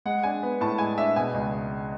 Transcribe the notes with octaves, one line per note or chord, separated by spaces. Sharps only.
G#3 F#5
D4 G#5
B3
A2 A5
G#3 G#5
D4 E5
B2 G#5
C#2